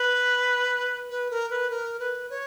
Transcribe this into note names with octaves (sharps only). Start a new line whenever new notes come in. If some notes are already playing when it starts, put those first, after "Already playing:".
Already playing: B4
B4
A#4
B4
A#4
B4
C#5